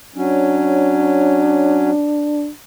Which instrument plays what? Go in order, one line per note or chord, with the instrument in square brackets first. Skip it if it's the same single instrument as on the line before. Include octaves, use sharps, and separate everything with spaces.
[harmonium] F#3 C#4 [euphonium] D4